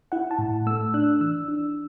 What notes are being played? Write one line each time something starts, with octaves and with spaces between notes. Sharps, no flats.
E4 F#5
A5
A2
A3 E6
D4 F#6
E3 E6
D4